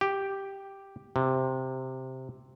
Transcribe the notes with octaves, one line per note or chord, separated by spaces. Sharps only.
G4
C3